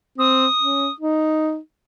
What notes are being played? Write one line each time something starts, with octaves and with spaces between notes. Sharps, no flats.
C4 D#6
C#4
D#4